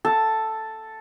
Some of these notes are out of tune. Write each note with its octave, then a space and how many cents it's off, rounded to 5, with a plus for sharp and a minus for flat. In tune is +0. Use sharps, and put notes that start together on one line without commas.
A4 +0 A5 +0